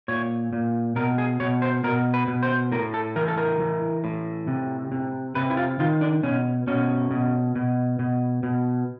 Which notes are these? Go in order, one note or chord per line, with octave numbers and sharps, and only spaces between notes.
A#2 C#5
A#2
B2 A#4
G#4
B2 C#5
C5
B2 A#4
B4
B2
C5
A2 A#4
A4
E3 A#4
A4
A#4
E3
A2
C3
C3
C3 B4
E4
F4
D#3 F4
D4
B2 C#4
B2 C#4
B2
B2
B2
B2